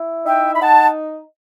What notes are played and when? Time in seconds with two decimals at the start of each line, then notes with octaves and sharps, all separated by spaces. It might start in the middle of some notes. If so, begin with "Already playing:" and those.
Already playing: E4
0.26 D#4 E5 G5
0.55 B5
0.60 D#4 F#5 A5